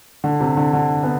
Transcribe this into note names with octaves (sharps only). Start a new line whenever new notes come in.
D3
C3
D3
D3
B3